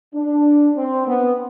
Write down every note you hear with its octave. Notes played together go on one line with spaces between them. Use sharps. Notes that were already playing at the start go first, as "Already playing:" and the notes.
D4
C4
B3